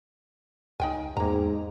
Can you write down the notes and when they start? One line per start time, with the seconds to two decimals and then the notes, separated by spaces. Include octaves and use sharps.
0.80 C#2 D#4 G5 G#5
1.17 E2 G#2 A#3 A#5